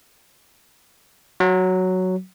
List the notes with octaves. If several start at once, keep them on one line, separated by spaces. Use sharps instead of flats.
F#3